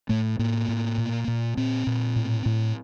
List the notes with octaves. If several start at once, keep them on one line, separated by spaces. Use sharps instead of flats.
A2 A3
A2 A#3
A2
A#2
A#2
A#2 C4
A#2
A2
A2